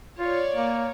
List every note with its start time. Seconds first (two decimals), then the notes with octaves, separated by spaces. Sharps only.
0.19 F4 C#5 D5
0.55 A#3